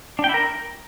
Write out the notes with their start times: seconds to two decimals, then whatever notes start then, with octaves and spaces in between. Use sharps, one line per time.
0.19 D4
0.24 G5
0.29 E4
0.34 A#4